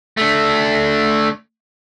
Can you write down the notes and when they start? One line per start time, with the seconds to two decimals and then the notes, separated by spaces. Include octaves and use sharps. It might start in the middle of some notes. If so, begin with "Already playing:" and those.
0.17 A3 D4